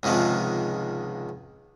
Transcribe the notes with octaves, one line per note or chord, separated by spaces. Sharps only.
C#2 G#2 C3 D#3 F3